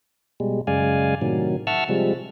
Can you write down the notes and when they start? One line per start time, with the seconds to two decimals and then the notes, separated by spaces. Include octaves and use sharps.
0.40 B2 G3 G#3
0.67 F#2 C#3 G#3 D5 F5 G#5
1.22 A2 C3 D#3 F#3
1.67 E5 F#5 A5 C#6 E6 F6
1.89 C3 F3 G3 G#3